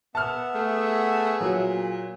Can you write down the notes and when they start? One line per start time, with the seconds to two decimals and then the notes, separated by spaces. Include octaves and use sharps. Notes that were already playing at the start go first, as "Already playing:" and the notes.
0.15 B3 E5 F#5 A5 F6
0.55 A3 G#4
1.41 A#2 F#3